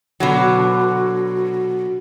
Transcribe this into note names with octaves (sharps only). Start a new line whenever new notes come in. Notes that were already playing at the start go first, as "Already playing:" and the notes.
B2 D3 F#3